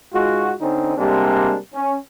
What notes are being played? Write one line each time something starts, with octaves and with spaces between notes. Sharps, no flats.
G#2 G#3 F4 F#4
D3 C4 C#4 D#4
C3 G3 G#3 A#3 D4
C#4